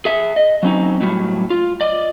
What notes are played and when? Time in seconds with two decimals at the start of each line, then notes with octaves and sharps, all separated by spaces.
0.05 G#4 E5
0.36 D#5
0.63 F#3 C4 C#4 D#4
1.01 A2 F#3 G3
1.50 F4
1.81 D5 D#5